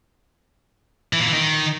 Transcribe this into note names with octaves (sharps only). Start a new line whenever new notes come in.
E3
A#2
E3
D#3